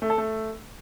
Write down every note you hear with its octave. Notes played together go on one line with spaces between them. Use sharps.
A3
A4
A3